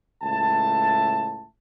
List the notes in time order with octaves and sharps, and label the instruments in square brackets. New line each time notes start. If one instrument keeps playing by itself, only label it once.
[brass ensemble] C#2 A2 E5 A5